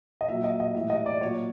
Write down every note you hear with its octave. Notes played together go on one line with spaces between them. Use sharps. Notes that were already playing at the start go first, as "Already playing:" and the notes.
D#5
A#2 F#3 E5
D#5
D#5
A2 E3 G3 E5
D#5
D5
A#2 F#3 C#5